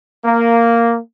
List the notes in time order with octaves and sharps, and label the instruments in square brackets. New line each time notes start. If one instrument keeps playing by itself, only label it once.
[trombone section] A#3